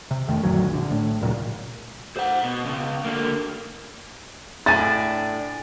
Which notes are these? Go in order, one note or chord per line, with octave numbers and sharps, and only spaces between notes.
C3
F2 D#3 A3
A1 D2 F#3
A#1 D3
A2
D#1 A#2 C#3 F#3
C5 F#5
B2
C#2 C#3
D3 A#3
A2 D4 G#5 A6